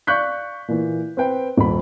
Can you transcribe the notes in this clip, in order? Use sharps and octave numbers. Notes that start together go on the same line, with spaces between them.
D5 F5 C#6 F#6 G6 B6
A#2 E3
C4 B4 G5
D#1 B5